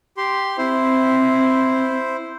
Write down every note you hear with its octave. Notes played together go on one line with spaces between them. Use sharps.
G4 C6
C4 E4 C5